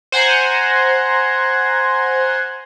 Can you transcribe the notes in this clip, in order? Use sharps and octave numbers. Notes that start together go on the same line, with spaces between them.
C5 F#5 G#5 A#5